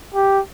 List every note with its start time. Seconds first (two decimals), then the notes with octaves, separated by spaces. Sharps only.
0.15 G4